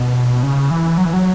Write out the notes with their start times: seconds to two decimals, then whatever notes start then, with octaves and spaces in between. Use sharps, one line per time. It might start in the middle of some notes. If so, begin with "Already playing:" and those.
Already playing: B2
0.43 C#3
0.71 E3
0.98 F#3
1.05 E3
1.13 F#3